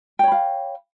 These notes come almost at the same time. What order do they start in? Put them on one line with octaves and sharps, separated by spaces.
G5 C#5 B5 F5